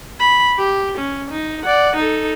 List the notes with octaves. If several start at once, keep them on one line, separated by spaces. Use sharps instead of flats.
B5
G4
C#4
D#4
D5 F#5
D#4 A4